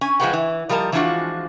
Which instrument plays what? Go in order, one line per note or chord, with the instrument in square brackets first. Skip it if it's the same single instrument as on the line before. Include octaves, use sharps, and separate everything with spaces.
[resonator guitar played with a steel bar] C#4 G#5
F3 G#3 G4 B4 F#5 G5
E3
F3 G3 A#4 D#5 A5
E3 F3 G#3 D4 F4 F#4